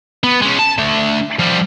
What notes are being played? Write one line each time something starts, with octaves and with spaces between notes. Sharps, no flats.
B3
G#3 C#4
A5
A3 D4
F3 G3